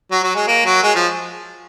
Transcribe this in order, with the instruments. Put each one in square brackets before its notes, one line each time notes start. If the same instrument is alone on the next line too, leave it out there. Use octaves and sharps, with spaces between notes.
[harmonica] F#3
F#3
G#3
A#3
F#3
G#3
F3